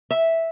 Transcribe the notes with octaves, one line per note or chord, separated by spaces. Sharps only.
E5